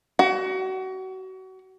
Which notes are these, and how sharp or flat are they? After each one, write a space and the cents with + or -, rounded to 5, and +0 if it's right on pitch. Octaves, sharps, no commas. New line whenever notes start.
F#4 +30